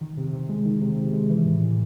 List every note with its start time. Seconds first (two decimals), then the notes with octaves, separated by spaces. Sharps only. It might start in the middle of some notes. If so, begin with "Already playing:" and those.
0.01 D#3
0.17 C3
0.33 C3
0.49 G#3
0.65 D#3
0.81 C3
0.97 C3
1.13 G#3
1.29 E3
1.45 A2
1.61 A2